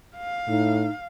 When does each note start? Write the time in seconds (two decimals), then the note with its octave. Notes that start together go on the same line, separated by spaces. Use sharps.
0.17 F5
0.48 A2 D#4